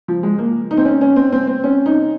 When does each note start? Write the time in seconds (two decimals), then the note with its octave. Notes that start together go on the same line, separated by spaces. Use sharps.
0.08 F3
0.23 G#3
0.39 A#3
0.71 D#4
0.77 C4
0.85 C#4
1.01 C#4
1.16 C4
1.32 C4
1.47 C4
1.64 C#4
1.86 D#4